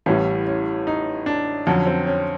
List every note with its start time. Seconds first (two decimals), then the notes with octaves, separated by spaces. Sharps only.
0.06 A1 A2 E3 G3 C#4
0.47 C#4
0.87 D#4
1.26 D4
1.67 F2 D3 F#3 C#4
1.86 C4
2.07 C#4